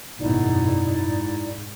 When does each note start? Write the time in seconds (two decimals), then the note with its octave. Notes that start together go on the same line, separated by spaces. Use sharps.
0.19 G#1 F#2 B2 D#4 E4 D5
1.02 G#2